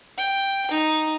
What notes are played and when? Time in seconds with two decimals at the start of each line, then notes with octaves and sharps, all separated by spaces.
0.18 G5
0.71 D#4